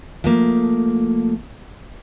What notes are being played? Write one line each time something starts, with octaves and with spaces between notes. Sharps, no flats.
F3 A3 A#3